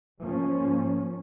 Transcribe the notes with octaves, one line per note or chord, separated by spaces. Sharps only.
G#2 F3 A#3 C#4